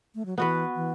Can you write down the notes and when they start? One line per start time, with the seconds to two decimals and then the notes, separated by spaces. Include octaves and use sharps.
0.15 A3
0.26 F#3
0.38 E3 B3 F#4 B4
0.75 E3